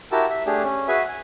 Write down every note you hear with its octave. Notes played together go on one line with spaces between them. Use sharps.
E4 F#4 G4 A#4 A5 E6
E5
A3 D4 G4 G#4
C#4
F#4 G#4 B4 E5 G#5
G#5